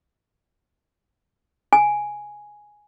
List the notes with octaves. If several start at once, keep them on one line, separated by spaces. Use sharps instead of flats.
G#5